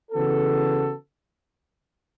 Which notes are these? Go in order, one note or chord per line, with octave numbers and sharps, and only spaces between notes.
C#3 E3 B3 F#4 A4